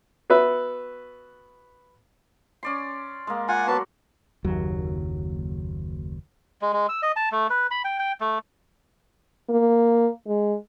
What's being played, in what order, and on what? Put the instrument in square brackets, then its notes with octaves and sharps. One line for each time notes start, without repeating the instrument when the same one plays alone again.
[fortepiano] B3 F#4 B4 E5
[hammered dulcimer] C#4 D5 C6
G#3 A#3
[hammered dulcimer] F4 [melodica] F#5 G#5
[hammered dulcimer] F#3 F#4 [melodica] B3 B4 A5
[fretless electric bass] F#1 D#2 F#3
[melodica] G#3
G#3
E6
D#5
A5
A3
B4
B5
G5
G5
A3
[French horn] A#3
G#3